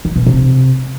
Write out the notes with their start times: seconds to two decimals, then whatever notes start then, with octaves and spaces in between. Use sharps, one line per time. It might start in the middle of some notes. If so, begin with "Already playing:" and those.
0.05 D#3
0.16 B2
0.26 C3